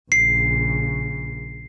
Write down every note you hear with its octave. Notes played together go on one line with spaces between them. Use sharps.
A#1 C#3 C7